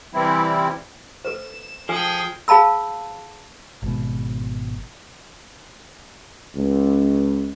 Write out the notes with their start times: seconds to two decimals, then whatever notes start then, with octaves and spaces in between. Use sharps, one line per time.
0.14 C3 E3 G3 C4 E4
1.25 A4 B4 C5 E7
1.89 F3 G#4 A4 G5 G#5 E6
2.48 G#4 F5 A5 B5 E6
3.82 G#1 B2
6.56 C#2